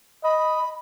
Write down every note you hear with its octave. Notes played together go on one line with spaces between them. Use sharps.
D#5 B5